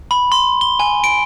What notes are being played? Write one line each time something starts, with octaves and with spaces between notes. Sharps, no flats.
B5
C6
G7
G#5
D7